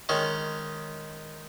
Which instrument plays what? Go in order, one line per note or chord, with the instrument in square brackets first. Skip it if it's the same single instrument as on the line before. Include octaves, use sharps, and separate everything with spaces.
[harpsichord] D#3 G#3 C#4